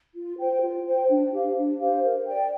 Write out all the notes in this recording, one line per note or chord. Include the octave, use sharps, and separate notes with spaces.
F4
C5 G5
F4
C5 G5
D4
G4 C5 F5
D4
G4 C5 F5
A#4
D5 G5